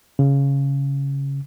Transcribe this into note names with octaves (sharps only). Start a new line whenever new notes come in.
C#3